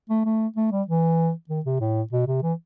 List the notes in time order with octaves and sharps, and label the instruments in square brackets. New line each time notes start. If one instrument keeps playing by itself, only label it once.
[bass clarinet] A3
A3
A3
G3
E3
D#3
C3
A2
B2
C3
E3